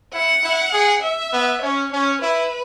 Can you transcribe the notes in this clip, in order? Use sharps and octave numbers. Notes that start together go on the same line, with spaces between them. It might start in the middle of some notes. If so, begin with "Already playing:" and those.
E4 F#5
E4
G#4
E5
B3
C#4 C#5
C#4 C#5
E4 B4